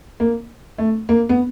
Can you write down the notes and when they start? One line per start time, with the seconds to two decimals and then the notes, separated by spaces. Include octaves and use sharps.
0.20 A#3
0.78 A3
1.09 A#3
1.29 B3